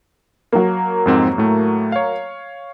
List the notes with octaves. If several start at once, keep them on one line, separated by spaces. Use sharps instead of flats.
F#3 A#3
F2 G#2 C4
A2 A3
C#5 F5